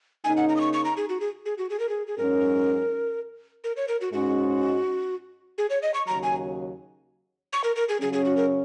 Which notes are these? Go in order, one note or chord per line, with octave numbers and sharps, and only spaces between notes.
C#3 A#3 D#4 G#5
F#5
A#5
D#6
C#6
C#6
A#5
G#4
F#4
G#4
G#4
F#4
G#4
A#4
G#4
G#4
G#2 F#3 C#4 A#4
A#4
C#5
A#4
F#4
G#2 G#3 C#4 F#4
G#4
C#5
D#5
C#6
D#2 C#3 F#3 A#5
G#5
C#6
A#4
A#4
G#4
C#3 F#3 C#4 G#4
G#4
F#4
A#4